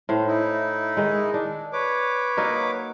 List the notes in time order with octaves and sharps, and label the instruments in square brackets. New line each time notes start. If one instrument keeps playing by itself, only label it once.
[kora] A2 C5 F5
[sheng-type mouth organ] D#4 E4
[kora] D#3 G#3
D4
[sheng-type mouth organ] B4 C#5 D6
[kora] F#3 A#3 D#4